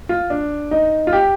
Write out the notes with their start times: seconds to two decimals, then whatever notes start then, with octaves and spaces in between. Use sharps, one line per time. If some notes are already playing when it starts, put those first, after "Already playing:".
0.09 F4
0.30 D4
0.71 D#4
1.07 F4
1.13 G4